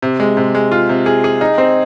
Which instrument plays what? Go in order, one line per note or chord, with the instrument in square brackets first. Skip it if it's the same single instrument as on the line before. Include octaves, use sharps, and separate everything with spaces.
[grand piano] C3
G#3
C3
G#3
F4
C3
G#4
G#4
D#4
C4